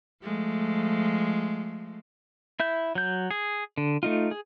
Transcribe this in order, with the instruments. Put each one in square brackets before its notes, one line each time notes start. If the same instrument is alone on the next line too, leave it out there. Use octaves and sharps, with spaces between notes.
[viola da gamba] F3 G#3 A3
[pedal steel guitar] E4 E5 G6
F#3 G6
G#4
D3
A3 D#4 F4
G#4